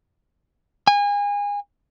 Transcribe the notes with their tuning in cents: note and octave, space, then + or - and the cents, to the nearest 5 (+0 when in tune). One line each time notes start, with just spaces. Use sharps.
G#5 -30